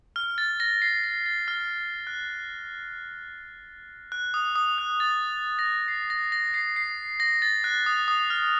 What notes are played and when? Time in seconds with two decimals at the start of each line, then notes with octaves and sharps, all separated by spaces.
0.16 F6
0.38 A6
0.60 A#6
0.82 C7
1.04 A#6
1.26 A6
1.48 F6
2.07 F#6
4.12 F#6
4.34 D#6
4.56 D#6
4.78 F#6
5.00 A6
5.59 A#6
5.88 C7
6.10 A#6
6.32 A#6
6.54 C7
6.76 C7
7.20 A#6
7.42 A6
7.64 F#6
7.86 D#6
8.08 D#6
8.30 F6